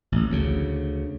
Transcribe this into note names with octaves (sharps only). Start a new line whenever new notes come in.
A1
D2 C#3